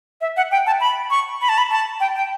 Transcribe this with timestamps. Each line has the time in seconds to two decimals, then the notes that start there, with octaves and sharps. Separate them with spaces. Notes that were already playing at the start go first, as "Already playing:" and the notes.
0.21 E5
0.37 F#5
0.51 G5
0.67 A5
0.81 B5
1.10 C#6
1.41 B5
1.49 A5
1.58 B5
1.71 A5
2.00 G5
2.16 G5